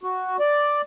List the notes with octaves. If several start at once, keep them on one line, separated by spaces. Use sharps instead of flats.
F#4
D5